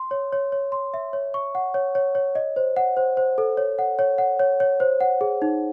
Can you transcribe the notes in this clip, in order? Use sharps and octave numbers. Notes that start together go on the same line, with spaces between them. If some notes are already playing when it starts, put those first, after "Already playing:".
Already playing: C6
C#5
C#5
C#5
C6
E5
C#5
C#6
F#5
C#5
C#5
C#5
D#5
C5
F#5
C5
C5
A4
C#5
F#5
C#5
F#5
C#5
C#5
C5
F#5
G#4
D#4